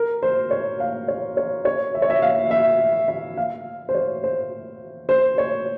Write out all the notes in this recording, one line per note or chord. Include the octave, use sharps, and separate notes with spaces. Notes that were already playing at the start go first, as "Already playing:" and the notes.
Already playing: A#4
C5
C#5
F5
C#5
C#5
C#5
E5
C#5
E5
F5
E5
E5
F5
C5
C#5
C5
C5
C#5